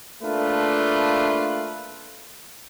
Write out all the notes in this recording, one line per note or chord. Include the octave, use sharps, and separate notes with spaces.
A3 A#3 D4 F4 B4